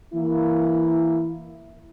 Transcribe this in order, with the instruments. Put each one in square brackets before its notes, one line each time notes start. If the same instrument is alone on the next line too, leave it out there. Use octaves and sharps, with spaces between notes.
[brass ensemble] E3 A#3 E4